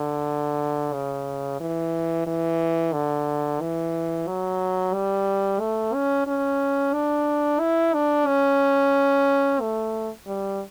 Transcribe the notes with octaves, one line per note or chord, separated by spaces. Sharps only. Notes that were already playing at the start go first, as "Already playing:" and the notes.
Already playing: D3
C#3
E3
E3
D3
E3
F#3
G3
A3
C#4
C#4
D4
E4
D4
C#4
A3
G3